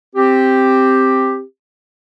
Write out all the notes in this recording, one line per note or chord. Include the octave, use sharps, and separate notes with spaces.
C4 G4